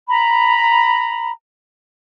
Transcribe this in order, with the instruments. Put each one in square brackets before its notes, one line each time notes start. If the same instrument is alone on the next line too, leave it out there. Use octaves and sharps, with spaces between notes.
[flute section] A#5 B5